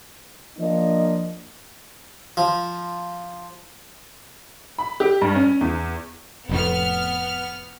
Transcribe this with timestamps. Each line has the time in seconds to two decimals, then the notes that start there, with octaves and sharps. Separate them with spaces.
0.58 F3 A#3 D4 D#5
2.37 F3
4.78 B5
5.00 G4
5.21 G2
5.35 C#4
5.61 E2
6.49 F1 F2 A2 B3 F6